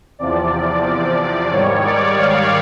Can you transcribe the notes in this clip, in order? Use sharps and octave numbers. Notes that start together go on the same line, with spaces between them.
E2 C3 F3 D5
G#2 D#3 G3 C#5
D5
F5